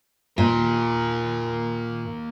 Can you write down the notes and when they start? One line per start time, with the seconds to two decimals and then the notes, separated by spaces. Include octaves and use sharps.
0.38 A#2 A#3 D#5